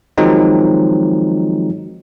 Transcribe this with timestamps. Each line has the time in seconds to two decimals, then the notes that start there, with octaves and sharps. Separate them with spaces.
0.18 D#3 F3 F#3 G#3 C4 D#4